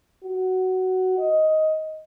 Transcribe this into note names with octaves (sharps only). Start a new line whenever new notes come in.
F#4
D#5